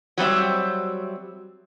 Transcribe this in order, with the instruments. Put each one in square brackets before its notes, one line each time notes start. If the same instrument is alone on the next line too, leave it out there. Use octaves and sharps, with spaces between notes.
[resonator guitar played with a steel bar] F#3 G3 C4 E5